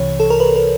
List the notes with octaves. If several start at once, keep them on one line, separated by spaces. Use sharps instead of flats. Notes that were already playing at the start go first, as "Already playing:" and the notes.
Already playing: C2 C3 E3 C#5
A4
A#4
B4
A#4